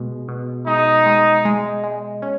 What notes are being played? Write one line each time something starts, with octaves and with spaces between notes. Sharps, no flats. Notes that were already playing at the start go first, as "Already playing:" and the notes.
Already playing: B2 G#3
B2
G#3 D#4
G#3
G#3
G#3
C#4